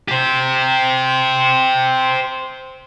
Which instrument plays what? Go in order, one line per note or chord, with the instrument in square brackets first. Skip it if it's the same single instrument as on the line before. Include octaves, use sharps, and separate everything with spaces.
[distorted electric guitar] G4 C5